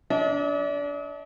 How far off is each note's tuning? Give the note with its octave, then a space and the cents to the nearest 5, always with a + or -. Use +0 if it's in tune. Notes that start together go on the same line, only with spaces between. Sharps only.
D4 -30 D#5 +40